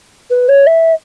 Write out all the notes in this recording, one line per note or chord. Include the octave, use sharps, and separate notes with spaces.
B4
C#5
E5